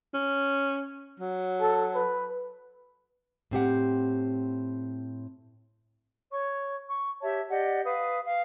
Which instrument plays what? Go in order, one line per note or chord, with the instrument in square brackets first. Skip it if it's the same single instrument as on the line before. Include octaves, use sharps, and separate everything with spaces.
[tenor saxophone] C#4
F#3
[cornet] A4
B4
[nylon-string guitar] A2 C4 G4 F#5
[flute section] C#5 C#6
C#6
G4 C#5 E5 A5
G4 D5 D#5 F#5
B4 F5 D#6
F5